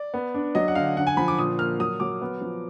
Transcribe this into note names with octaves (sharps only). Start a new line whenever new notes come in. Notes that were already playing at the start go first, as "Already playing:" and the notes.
Already playing: D5
B3
D4
F#3 D#5
F#5
D3 F5
D3 F#5
G#5
F3 B5
D6
A#2 D#6
A#3 F6
F#3 D#6
F#3 D6
B3
F3